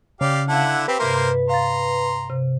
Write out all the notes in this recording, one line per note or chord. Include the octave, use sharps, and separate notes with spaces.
C#3 G4 D5 F5
D3 E4 F5 F#5 A5
C4 G4 B4
G2 C3 A#3 A#4 C5 E5
F5 A#5 C6 A6
C3